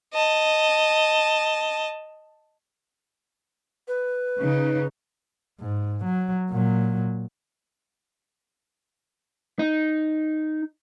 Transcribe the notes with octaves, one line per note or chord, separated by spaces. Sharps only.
D#5 A5
B4
C#3 D#4
G#2
F#3
A#2 F#3
D#4